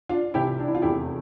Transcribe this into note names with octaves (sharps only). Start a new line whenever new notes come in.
D4 F4
C2 C3 E3 E4 G4
D4
E4
F4
F1 E2 E3 E4 G4